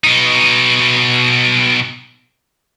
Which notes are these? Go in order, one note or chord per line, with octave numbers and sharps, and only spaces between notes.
B2 D#4